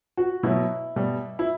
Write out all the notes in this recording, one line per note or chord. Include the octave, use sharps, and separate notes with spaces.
F#4
B2 F#3 E4
B2 G3
E4